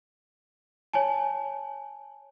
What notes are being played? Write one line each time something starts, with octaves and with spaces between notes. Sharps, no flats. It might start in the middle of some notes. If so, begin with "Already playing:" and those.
C#5 G#5 A5